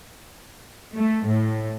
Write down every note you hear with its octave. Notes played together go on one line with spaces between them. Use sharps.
A3
A2